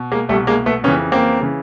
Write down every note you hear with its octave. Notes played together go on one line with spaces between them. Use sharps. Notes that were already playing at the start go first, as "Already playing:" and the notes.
Already playing: B2
G#3 A#3
C2 B2 G3 A3
G#3 A#3
A3 B3
F2 C#3 E3 B3 C#4
A#3 C4
C#3 E3